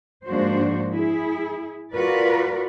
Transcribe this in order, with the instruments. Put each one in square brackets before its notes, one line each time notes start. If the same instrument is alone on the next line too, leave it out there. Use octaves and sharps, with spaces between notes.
[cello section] G#2 F3 A#3 D4 F#4 C5
E4 G#4
F4 F#4 A#4 B4 D5